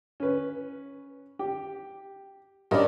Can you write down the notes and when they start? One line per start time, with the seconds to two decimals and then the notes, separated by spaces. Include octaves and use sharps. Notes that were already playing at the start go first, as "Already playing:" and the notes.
0.20 C#4 B4
1.39 G4
2.71 G2 C#4 A#4 D5 D#5